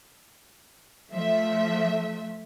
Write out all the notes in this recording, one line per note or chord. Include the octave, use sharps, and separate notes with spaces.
F3 A3 E5